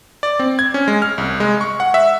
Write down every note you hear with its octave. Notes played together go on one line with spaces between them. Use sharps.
D5
C4
G#6
C#4
G#3
F6
C2
G#3
C#6
F#5
E5